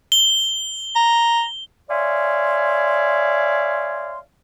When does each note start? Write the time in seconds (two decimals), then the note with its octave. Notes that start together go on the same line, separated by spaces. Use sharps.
0.12 G7
0.96 A#5
1.89 C#5 D5 E5 F5 G#5 C6